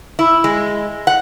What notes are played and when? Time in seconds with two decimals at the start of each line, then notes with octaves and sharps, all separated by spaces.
0.19 E4
0.44 G#3
1.07 F#5